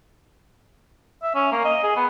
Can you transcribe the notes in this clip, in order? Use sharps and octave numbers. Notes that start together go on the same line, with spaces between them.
E5
C#4
A#3
D#5
G#4
B3